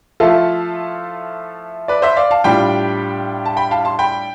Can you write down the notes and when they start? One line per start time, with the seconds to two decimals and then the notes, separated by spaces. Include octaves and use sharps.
0.20 F3 A3 E4 F4 A4
1.88 B4 D5
2.02 C5 E5
2.17 D5 F5
2.31 F5 A5
2.44 A2 G3 D4 F4 G5 B5
3.45 A5
3.57 G5 B5
3.71 F5 A5
3.85 A5 C6
3.99 G5 B5